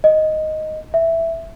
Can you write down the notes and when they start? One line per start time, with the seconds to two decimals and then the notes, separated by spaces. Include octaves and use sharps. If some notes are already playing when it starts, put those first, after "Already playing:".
0.04 D#5
0.94 E5